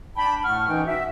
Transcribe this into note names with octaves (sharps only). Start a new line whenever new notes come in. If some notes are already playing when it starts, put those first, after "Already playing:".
D4 G5 A5 B5
A2 A3 F#5 C#6 F6
F#2 E3 D#4 G5
F#4 E5